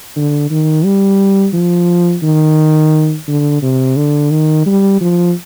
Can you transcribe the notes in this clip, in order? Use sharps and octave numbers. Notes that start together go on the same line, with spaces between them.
D3
D#3
G3
F3
D#3
D3
C3
D3
D#3
G3
F3